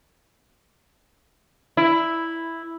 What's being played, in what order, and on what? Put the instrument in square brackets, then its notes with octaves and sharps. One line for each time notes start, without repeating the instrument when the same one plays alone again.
[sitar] E4